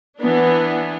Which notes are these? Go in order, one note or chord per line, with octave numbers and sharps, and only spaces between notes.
E3 B3 D4